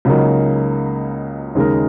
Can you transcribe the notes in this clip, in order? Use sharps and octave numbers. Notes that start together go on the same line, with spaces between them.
C#2 C#3 F#3 A#3 D#4
D#2 C#3 G#3 D#4 A#4